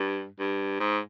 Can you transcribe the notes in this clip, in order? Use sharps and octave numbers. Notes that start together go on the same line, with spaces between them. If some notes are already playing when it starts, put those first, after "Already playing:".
Already playing: G2
G2
G#2